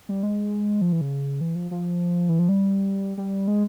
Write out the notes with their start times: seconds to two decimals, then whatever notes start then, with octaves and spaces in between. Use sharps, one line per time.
0.09 G3
0.23 G#3
0.81 F3
0.92 E3
1.01 C#3
1.41 E3
1.55 F3
1.71 F3
2.29 E3
2.39 F3
2.49 G3
3.17 G3
3.48 G#3